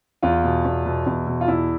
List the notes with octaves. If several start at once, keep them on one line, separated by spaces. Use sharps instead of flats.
E2 F4
B2
E2
B2
E2
B2
F4
E2 E4